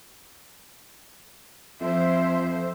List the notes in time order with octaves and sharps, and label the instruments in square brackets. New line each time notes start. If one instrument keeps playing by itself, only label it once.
[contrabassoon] F2 [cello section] F3 C5 [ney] E5